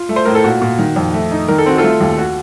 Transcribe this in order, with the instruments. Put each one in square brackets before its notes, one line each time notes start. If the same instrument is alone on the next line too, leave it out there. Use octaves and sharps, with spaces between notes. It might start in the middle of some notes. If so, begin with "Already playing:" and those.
Already playing: [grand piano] F4
A3
C5
A2 A#4
A4
A#2 F#4
A#2
D#3
F2
A3
D#4
D#3 A#4
A4
C4 F#4
F4 A4
A3
D#2
F#4